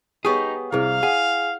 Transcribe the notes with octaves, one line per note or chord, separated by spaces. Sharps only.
B3 D#4 G4 G#4 C#5 C#6 D#6
C2 C3 E4 G#4 C5 F5
G#4 F#5